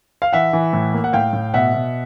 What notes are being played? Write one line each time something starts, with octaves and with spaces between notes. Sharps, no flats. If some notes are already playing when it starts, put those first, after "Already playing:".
F5
E3 E5 F#5
E3
A2
A#3
F#5
A2 F5 G5
A2
B2 E5 F#5
B2